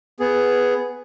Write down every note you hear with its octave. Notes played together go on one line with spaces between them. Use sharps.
B3 G#4